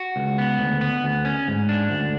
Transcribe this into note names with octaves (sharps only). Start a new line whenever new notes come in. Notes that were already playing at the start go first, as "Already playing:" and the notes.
Already playing: F#4
C#2
B3
D2
B3
D2
C#4
G#2
D4
D2